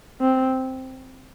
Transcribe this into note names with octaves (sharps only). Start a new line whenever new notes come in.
C4